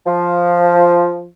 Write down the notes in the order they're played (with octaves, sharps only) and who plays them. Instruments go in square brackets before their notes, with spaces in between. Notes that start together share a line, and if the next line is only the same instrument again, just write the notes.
[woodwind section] F3